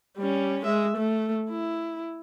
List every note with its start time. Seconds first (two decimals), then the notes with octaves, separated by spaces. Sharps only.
0.18 G3 C#4
0.66 G#3 E5
0.97 A3
1.50 E4